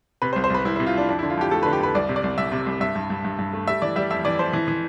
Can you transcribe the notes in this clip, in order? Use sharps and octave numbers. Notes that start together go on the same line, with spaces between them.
C3 B4
C5
C2
C5
C2 B4
C2 E4
E4
C3
F4
C2 D4
F2 D4
E4
D3
F4
F2 G4
A3 A4
B4
D3
G4
F2 B4
C2 D5
C3
D5
C2
C2 E5
C3
C2
G2 E5
G2
G2
G2
G2
A3
G3 E5
E3 D5
G3 E5
F2 E5
E3 D5
F2 C5
E3
E3